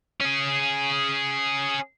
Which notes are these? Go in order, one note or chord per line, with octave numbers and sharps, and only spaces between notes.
C#4 G#4